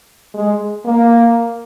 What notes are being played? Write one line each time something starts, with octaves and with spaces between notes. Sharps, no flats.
G#3
A#3